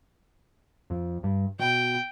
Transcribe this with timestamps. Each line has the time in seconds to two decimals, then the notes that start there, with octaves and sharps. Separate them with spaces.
0.90 F2
1.23 G2
1.59 B2 G5